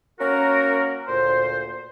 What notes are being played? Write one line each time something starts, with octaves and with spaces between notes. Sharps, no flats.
A#3 C#4 F#4 A#4
D2 A#2 C5